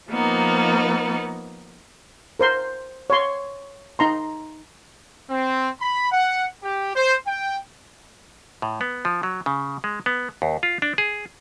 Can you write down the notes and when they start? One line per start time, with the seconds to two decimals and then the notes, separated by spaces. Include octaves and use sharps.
0.11 F3 A#3 B3 D#4
2.40 A#4 C5 C6
3.10 C#5 C6
3.99 D#4 A#5 C6
5.30 C4
5.81 B5
6.12 F#5
6.63 G4
6.96 C5
7.27 G5
8.62 A2
8.81 B3
9.05 F3
9.23 F#3
9.46 C#3
9.84 G#3
10.06 B3
10.42 D#2
10.63 F4
10.82 D4
10.98 G#4